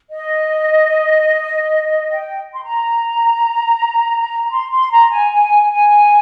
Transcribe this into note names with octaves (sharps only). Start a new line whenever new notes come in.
D#5
G5
C6
A#5
C6
C6
A#5
G#5
G#5
G#5